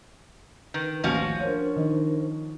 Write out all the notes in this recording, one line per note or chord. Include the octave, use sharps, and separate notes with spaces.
D#3 B4
A1 D#2 F3 C#4 F#4 F5 G#5
D4 A#4 C5 C#5
D#3